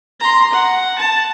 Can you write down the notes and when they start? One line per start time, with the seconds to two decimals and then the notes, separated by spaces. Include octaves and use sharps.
0.20 A#5 C6
0.53 F#5
0.98 A5